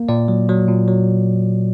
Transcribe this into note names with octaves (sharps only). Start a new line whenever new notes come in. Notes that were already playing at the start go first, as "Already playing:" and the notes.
Already playing: A#3
A#2 D5
F#3
F#3
A#2
F#3